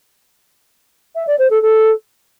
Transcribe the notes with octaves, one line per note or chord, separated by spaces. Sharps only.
E5
D5
C5
A4
A4